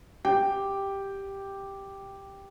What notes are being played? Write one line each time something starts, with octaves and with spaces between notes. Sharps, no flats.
G4 G5